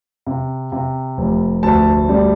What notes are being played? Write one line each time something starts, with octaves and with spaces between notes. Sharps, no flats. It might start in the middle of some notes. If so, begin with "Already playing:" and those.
C3
C3
F1
D2 A5
G3